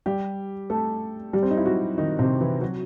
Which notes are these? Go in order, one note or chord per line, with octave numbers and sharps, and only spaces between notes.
G3 G4
A3 A4
G3 G4
C4
D#4
E4
F#3 F#4
D#3 D#4
C3 C4
E3 E4
F#3 F#4